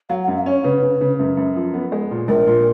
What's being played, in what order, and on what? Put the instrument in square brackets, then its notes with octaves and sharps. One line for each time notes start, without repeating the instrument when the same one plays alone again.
[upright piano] F#3 [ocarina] F5
[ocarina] F#5
[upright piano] F#2
[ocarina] F5
[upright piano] C#4 [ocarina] C#5
[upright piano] C#3 [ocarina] B4
[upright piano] C#3
C#3
F#2
F#2
F3
B3
G#3
A#2
[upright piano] A#1 [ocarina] A#4
[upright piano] A#2